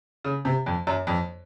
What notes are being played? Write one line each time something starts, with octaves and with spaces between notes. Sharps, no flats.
C#3
C3
F2
F#2
F2